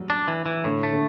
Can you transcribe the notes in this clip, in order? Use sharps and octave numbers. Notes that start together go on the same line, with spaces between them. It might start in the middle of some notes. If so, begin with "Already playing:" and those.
Already playing: F#3 G3 A3
D4
E3
E3
A2 D3
A3
D3